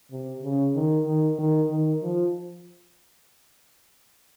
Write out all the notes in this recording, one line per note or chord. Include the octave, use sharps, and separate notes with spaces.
C3
C#3
D#3
D#3
D#3
D#3
F3